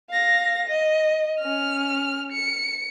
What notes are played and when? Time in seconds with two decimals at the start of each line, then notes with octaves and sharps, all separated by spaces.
0.10 F5 A#6
0.68 D#5
1.40 C#4 F6
2.32 C#7